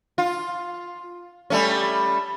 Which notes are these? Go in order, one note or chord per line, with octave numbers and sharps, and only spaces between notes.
F4
G3 A3 C#4